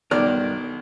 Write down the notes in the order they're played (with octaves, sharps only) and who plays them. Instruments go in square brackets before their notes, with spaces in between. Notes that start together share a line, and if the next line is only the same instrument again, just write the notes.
[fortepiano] B1 D#3 F6 [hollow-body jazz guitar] G2 A#4 D5